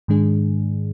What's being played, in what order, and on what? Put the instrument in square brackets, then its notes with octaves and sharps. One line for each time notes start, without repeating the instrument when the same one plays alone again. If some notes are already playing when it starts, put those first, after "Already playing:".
[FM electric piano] G#2 D#3 G#3 D4 G#4